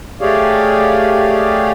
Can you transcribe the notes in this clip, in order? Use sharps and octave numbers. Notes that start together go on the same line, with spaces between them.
A3 G4 G#4 C#5 D5 F5